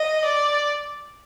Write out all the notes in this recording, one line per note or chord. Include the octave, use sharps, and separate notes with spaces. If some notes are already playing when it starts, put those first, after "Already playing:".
Already playing: D#5
D5